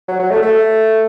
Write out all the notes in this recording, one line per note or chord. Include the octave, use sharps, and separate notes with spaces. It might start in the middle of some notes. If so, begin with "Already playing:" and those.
F#3
F#3
A3
A3